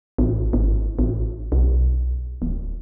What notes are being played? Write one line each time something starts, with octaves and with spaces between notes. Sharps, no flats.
A1
G#1
A1
B1
D1